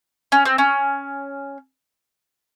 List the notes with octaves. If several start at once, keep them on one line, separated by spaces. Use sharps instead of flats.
C#4
C4
C#4